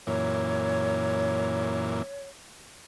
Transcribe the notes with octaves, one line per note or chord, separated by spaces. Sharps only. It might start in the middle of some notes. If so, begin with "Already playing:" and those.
F#2 A#2 E3 C#5